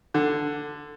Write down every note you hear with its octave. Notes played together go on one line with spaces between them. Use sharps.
D3